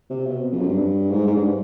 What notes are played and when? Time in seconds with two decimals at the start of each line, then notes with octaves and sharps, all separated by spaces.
0.10 C3
0.27 B2
0.52 F2
0.60 F#2
0.69 G2
1.10 G#2
1.27 G#2
1.36 G2